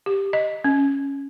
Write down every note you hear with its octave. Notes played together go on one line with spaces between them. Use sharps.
G4
D#5
C#4